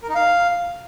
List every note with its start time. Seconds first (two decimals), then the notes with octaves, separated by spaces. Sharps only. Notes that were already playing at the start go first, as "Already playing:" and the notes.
0.03 A#4
0.09 D#4
0.15 F5